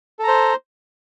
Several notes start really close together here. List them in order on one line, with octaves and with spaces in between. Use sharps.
A4 A#5 C5